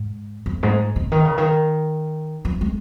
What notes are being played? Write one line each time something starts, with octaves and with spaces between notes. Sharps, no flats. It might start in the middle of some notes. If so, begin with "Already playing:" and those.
Already playing: G#2
F2
G#2
C#3
D#3
C#3
D#3
F3
G#3